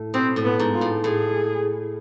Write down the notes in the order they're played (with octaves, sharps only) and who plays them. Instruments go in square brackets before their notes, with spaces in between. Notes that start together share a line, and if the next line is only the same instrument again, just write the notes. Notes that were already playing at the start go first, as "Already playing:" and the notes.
Already playing: [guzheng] A2
[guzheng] B2 [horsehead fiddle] C4
[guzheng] A2
[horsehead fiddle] B3
[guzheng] G#2
[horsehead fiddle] F4
[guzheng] A2
[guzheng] A2 [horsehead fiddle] G#4